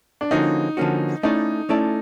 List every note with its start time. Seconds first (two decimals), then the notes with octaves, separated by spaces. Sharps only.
0.21 D4
0.31 D3 F3 A#3 C#4 D#4 F#4
0.77 D3 F3 A#3 C#4 F#4
1.23 A3 C#4 D#4 E4 A4 D5
1.69 A3 C#4 E4 A4 D5